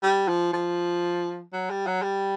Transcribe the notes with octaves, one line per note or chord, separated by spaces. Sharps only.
G3
F3
F3
F#3
G3
F#3
G3